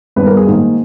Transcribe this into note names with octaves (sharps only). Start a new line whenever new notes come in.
G2 D#3 G3 B3 B4
A#4
G#4
G#2 D#3 A#3